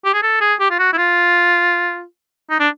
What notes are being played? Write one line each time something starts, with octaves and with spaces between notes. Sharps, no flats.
G4
G#4
A4
G#4
G4
F4
F#4
E4
F4
D#4
D4